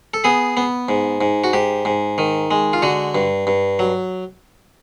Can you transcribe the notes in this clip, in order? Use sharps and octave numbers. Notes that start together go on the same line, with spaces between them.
A4
B3 G#4
B3
G#2
G#2
F#4
G#2 G4
G#2
D#3
G#3
F4
D3 F#4
G2
G2
F#3